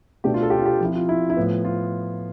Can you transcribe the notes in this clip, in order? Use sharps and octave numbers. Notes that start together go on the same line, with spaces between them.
B2 A3 D4 G4
F4
A4
G4
F4
G4
F3 C4 E4 F4
F4
E4
E4
A2 F3 B3
F4